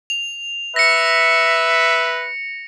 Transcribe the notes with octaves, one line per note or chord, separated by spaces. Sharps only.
F7
B4 E5 A#6 C#7